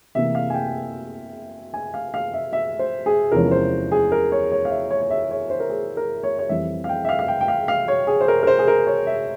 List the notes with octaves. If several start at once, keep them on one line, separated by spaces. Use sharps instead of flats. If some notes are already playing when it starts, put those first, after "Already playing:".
C3 E3 A#3 E5
F5
G#5
G5
G#5
F5
F5
E5
E5
C5
G#4
E2 C3 F3 G#3 C#4 A#4
C5
G#4
A#4
C#5
C#5
F5
E5
C#5
C#5
E5
C#5
C5
A#4
G#4
A#4
C#5
C#5
F2 E3 G3 C4 E5
F5
G5
E5
F5
F5
G5
G5
F5
F5
C#5
G#4
C5
A#4
A#4
C5
G#4
A#4
C#5
E5